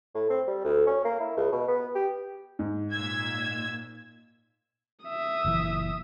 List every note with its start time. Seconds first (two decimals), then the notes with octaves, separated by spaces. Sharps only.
0.15 A2
0.30 C4
0.48 G3
0.64 D2
0.87 C#4
1.05 A#3
1.20 E4
1.37 C#2
1.52 B2
1.68 B3
1.95 G4
2.59 G#2
2.93 A#2 E6 G#6
5.06 E5 D#6
5.45 F#1 A#2 E3